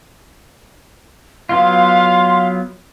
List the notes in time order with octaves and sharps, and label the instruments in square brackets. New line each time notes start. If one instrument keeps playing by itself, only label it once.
[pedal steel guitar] F#3 B3 F4 [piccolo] F5 [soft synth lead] C6